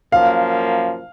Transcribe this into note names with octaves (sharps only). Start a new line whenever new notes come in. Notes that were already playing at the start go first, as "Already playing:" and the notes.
F#2 F3 A#3 F5